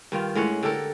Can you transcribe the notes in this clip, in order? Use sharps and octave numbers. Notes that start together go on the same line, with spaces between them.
G2 D#3 F4
A2 G#3 C#4 F#5
D3 G4 A4 A#4